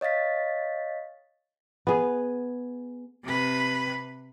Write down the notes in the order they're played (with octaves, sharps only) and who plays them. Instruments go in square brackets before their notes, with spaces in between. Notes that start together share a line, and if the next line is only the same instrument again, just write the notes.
[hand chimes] C#5 D#5 F5 A6 B6
[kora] B3 G#4
[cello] C3 B4